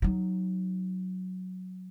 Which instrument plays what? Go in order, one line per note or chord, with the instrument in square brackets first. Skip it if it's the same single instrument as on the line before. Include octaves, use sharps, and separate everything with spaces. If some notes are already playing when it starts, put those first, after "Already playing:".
[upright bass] F#3 D#4